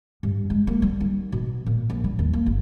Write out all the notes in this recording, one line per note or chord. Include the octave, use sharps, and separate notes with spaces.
G2
G#3
A#3
G3
D#4
B2
A#2
A#1
G3
D#2
A#3
G1